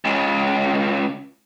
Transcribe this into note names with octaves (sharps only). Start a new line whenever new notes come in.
C#2 C#3